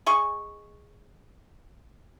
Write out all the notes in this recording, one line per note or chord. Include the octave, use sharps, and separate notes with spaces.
G#4 D#5 C#6